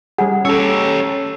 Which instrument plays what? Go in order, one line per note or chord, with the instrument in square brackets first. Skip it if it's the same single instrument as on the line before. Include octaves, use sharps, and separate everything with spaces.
[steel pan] G3 G#4 [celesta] F#5
[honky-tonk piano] C#4 A4 [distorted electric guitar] G4 C#5 [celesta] E6